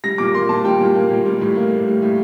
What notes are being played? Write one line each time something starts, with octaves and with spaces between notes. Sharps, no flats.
G3 A#6
A#2 D6
A#3 C6
A#2 A5
G3 G5
A#2
A#3
A#2
G3
A2
A#3
A2
G3
A2